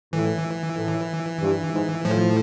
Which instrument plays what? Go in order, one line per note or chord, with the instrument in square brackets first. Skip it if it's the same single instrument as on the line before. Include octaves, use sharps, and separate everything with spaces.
[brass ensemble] A2 [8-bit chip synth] E3
[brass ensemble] A2
G2
G#2
[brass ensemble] A2 [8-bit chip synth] F3